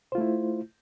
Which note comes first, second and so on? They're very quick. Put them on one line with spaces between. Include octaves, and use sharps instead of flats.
C5 F4 A3 E4